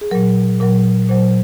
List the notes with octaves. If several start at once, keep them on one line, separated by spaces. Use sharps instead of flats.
G#4
A#2 F#3 A#4
A#2 F#3 A#4
A#2 F#3 C5